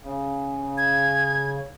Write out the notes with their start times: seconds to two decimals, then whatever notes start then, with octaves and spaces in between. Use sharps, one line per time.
0.04 C#3
0.78 G#6